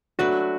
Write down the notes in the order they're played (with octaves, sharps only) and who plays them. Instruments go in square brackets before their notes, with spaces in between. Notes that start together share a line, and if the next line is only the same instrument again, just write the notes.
[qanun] F#3 A3 D4 B4 [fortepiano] F#4